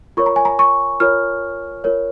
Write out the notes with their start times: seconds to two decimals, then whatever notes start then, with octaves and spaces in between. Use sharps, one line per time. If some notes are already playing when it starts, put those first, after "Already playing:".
0.17 F4 A#4 C#5 C#6
0.26 A#5
0.36 G#5
0.45 A#5
0.59 C#6
1.00 F4 A#4 C#5 F6
1.84 F4 A#4 C#5